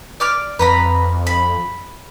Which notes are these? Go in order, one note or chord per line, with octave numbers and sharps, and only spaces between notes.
D5 D6 F6
F2 B4 A#5 B5
B5